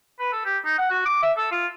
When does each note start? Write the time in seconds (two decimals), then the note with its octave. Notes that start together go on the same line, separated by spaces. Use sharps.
0.20 B4
0.32 A4
0.45 G4
0.65 D#4
0.78 F#5
0.90 F#4
1.06 D6
1.23 E5
1.37 A4
1.52 F4